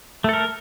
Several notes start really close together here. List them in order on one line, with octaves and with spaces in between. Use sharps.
A3 A4 A#4